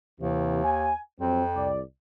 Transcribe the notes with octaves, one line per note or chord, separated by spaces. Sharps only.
D#2 C3 E3
G#5
F2 F3 F#3 C4
C2 D5